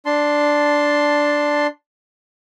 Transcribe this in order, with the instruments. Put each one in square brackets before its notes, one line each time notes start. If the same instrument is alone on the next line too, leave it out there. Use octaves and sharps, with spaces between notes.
[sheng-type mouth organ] D4 A5 C6